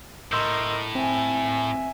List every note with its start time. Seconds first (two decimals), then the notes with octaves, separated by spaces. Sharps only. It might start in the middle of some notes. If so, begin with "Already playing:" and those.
0.32 A2 A#4 D#5 C6 E6 G6
0.95 C4 E5 G#5